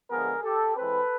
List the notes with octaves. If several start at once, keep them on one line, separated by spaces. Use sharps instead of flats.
D3 F3 G#3 B3 G#4 A#4
G4 A4
E3 G#3 C4 A4 B4